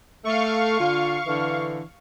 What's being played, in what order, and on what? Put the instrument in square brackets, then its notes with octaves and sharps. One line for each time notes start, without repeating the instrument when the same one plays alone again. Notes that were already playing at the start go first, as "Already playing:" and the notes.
[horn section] A3 [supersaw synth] F5 C#6
[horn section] D3 F4
D3 E3